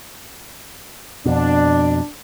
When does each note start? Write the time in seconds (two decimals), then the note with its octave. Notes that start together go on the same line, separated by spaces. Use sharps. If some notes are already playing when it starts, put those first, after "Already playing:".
1.26 F2 B2 D4